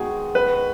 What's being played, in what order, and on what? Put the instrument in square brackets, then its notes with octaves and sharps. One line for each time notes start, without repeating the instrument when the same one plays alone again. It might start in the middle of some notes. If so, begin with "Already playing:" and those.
Already playing: [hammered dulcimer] D#3 G#3 B3 F#4 [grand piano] G#4
[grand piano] B4